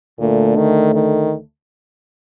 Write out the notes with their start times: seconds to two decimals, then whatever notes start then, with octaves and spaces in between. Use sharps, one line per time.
0.19 D2 A#2 D3 A3
0.56 D#3
0.95 D#3